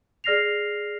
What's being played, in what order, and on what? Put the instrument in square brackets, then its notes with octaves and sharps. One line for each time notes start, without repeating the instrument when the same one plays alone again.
[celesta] G#4 D5 F6 A#6 C7 F7